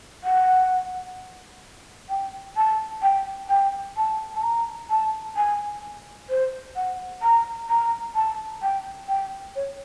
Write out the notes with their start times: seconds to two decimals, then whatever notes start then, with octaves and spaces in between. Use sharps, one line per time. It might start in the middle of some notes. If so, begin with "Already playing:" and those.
0.24 F#5
2.09 G5
2.57 A5
3.03 G5
3.49 G5
3.97 A5
4.35 A5
4.43 A#5
4.90 A5
5.37 G#5
6.30 C5
6.76 F#5
7.22 A#5
7.69 A#5
8.15 A5
8.62 G5
9.08 G5
9.56 C#5